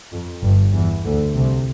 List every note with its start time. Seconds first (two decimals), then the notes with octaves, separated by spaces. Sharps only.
0.12 F2
0.43 G1 G2
0.73 E2 E3
1.04 D2 D3
1.35 C2 C3